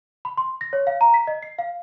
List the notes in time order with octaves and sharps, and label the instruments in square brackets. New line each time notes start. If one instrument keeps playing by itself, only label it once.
[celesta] B5
C6
A#6
C#5
F5
A#5
B6
D#5
C7
F5